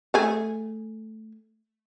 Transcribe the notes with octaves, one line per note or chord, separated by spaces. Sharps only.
A3 G#4